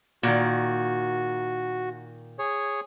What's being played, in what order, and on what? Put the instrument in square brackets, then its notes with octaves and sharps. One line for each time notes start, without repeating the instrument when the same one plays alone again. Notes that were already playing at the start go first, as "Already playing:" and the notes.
[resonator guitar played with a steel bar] A#2 D#3 [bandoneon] F#4
[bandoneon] G#4 C#5